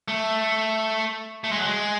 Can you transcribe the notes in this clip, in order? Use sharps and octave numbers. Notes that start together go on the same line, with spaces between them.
A3
A3
G#3
F#3
G#3